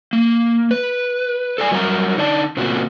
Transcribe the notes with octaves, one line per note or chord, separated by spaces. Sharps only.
A#3
B4
A4 D5 G#5
F#3 G3 A#4 F#5 G5 A#5
D3 D#4 D5 A5
A#2 C#3 A#3 C4 F4 F#4